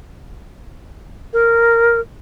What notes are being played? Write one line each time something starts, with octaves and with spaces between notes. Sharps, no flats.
A#4